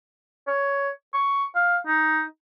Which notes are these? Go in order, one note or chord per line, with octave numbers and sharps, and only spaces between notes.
C#5
C#6
F5
D#4